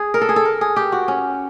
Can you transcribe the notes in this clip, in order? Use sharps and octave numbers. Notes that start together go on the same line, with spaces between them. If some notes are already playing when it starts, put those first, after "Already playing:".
Already playing: G#4
A#4
A4
G#4
A4
A#4
G#4
G4
F#4
C#4